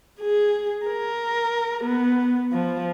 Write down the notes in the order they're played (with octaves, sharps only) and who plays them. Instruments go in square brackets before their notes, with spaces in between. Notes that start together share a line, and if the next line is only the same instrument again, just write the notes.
[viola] G#4
A#4
B3
F3